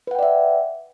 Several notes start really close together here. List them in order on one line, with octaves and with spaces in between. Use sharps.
B4 F#5 G5 D5 E5